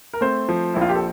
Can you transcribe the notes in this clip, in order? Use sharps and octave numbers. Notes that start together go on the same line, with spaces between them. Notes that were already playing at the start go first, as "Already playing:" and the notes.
A#4
A3 C4 C5
F3
A#1 E4
F4
G4
A4